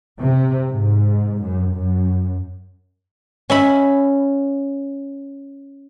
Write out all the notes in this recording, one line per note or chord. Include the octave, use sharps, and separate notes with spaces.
C3
G#2
F#2
F#2
C#4 E5 B5